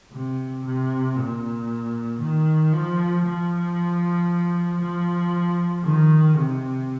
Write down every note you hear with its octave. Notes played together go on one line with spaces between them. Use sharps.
C3
C3
A#2
D#3
F3
F3
F3
D#3
C3